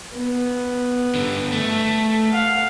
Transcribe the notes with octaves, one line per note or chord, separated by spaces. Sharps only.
B3
G2 D3
A3
F5 F#5